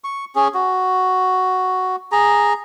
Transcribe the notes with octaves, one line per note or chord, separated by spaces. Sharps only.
C#6
C#4 G#4
F#4
G#4 A#5